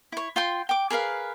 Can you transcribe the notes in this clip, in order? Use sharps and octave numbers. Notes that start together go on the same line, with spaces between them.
E4 C#5
F4 G5 C6
G5 D6
G#4 A#4 B4 F5